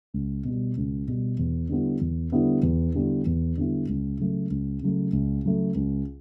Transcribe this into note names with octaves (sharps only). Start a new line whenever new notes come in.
C#2
B2 G3
C#2
B2 G3
E2
D3 G3 B3 E4
E2
D3 G3 B3 E4
E2
D3 G3 B3 E4
E2
D3 G3 B3 E4
C#2
C#3 F#3 A3
C#2
C#3 F#3 A3
C#2
C#3 F#3 A3
C#2